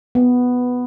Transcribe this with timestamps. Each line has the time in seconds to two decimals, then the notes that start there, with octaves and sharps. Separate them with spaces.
0.15 B3